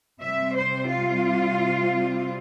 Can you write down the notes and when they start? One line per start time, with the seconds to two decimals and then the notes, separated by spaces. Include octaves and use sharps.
0.21 C3 G3 C4 E5
0.56 C5
0.90 F4